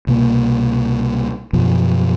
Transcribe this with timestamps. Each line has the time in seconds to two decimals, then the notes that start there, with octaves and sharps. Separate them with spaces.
0.07 C2 B2 A#3
1.53 F#2 B2 F3